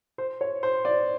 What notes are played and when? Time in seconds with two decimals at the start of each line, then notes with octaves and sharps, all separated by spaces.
0.18 C5
0.41 C#5
0.63 C5
0.85 D5